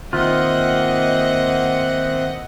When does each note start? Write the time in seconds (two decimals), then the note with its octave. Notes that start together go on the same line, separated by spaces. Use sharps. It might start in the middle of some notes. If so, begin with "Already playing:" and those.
0.13 D#3 A#3 C4 F4 D#5 E5 F#5 F#6